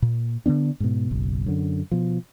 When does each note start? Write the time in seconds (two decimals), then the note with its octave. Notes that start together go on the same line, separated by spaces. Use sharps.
0.02 A#2
0.46 D3 F3 B3 D4
0.80 G#2 B2
1.11 F#1 B1
1.46 F#2 D3
1.92 B2 F3